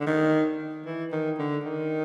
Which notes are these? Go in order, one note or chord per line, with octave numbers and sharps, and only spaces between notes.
D3
D#3
E3
D#3
D3
D#3